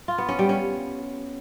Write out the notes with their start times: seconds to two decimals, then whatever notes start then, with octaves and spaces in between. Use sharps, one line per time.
0.08 F4
0.18 B3
0.29 C#4
0.39 G3
0.49 C#4